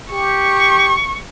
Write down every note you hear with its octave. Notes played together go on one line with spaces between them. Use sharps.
G4 C#6